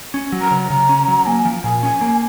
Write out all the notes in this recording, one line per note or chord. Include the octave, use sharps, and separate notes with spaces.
C#4
F#3
A#5
C#3
C#3
C#4
F#3
A#3 G#5
F3
A#2 G#5
C#4 G#5
A#3